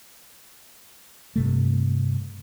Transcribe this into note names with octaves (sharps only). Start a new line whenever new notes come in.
G2 C3 A3